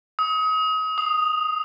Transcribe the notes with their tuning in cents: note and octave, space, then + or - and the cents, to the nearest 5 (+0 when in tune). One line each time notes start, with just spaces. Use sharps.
D#6 +35
D#6 -5